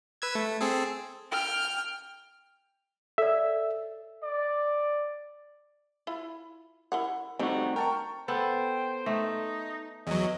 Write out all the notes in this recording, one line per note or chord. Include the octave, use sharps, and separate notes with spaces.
B4 E6 G#6
A3
C4 G#4 A4
G5 F6
A4 C#5 D5 E5
D5
E4 F4
E4 A#4 F#5
G3 A3 C4 D4 D#4 F#4
A#4 G5 A5 C#6
B3 A4 C5 G5
A3 D#4
E2 F#3 D#5